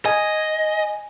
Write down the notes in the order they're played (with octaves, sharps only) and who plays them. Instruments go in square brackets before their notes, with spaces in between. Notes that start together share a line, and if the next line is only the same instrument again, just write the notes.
[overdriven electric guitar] D#5 [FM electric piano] G#5